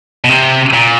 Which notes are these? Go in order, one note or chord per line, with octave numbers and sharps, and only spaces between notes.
B2
C3
A#2